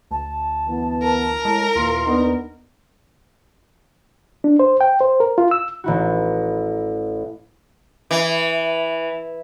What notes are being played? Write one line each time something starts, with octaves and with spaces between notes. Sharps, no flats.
D2 A5
E3 B3
A#4
A2 G#3
D#2 A#2 E3 F4 C6
B3 D4 D#4
D4
C5
G5
C5
A#4
F4
E6
A1 E4 F#4
E3